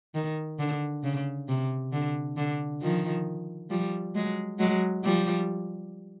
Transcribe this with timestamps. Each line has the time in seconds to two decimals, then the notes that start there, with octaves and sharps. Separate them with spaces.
0.15 D#3
0.59 D3
1.04 C#3
1.48 C3
1.92 D3
2.37 D3
2.82 D#3 F3
3.70 F3 G3
4.15 F#3 G#3
4.59 F#3 G#3
5.04 F3 G3